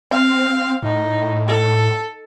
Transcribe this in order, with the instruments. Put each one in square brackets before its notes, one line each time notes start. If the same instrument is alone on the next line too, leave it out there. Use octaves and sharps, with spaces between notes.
[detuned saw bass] C4 [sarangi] F5
[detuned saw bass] A2 [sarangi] D#4
[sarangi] A4